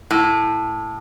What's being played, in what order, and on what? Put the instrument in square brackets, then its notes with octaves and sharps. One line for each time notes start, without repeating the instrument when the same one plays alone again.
[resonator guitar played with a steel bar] A2